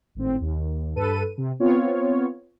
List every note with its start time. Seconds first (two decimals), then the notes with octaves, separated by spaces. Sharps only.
0.15 G#1 A2 C4
0.41 D#2
0.95 G2 A4 B4 D#7
1.38 C3
1.60 B3 C4 F4 C#5